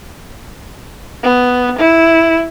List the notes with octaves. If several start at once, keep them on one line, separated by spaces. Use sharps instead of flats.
B3
E4